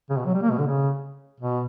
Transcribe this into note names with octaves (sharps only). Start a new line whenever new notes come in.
C#3
B2
F#3
G3
A#3
B2
D3
C#3
B2